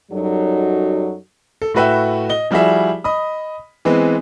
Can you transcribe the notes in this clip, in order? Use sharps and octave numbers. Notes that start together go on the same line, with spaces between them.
F#2 F#3 G3 D#4 F#4 A4
A4
A2 A3 F#4 B4 E5 G5
D#5 G7
F3 G3 E4 F#4 G#4 E5
D#5 B5 D#6
E3 G#3 B3 C4